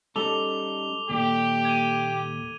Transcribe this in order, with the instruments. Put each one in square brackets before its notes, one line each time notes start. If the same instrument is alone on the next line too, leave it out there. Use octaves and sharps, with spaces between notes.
[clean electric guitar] G3 C#4 D#4 [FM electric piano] A4 [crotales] D6 F7 G7
[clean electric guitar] D#2 A#2 G3 [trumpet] G4
[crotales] G#6 D#7